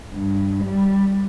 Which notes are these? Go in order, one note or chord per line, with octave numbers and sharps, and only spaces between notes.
G2
G3